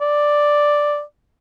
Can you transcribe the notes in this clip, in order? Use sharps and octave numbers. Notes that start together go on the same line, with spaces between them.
D5